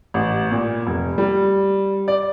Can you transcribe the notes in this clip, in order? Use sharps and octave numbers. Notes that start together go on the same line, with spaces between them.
A1
A#2
F1
G3
D5